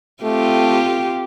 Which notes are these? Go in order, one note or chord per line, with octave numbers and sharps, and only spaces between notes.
A3 C4 F4 G4